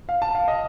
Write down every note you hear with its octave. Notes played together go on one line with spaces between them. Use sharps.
F5
A5
F5
D#5